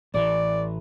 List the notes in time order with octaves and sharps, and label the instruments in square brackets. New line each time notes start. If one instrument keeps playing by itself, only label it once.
[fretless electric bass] A1 E3 [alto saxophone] D5